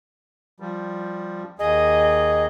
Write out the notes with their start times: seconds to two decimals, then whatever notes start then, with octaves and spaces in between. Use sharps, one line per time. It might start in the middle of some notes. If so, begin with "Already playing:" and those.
0.60 F3 G3
1.59 D#2 G#4 D#5